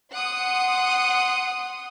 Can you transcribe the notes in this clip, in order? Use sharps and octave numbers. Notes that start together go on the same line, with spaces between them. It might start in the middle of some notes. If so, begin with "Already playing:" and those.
F#5 C6 D#6